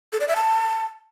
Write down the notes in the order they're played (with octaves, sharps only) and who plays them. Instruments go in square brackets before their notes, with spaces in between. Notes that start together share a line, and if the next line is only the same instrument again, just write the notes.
[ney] A4
D5
E5
A5